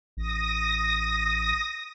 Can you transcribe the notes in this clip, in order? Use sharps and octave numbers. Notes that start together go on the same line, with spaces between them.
A1 D#6 A#6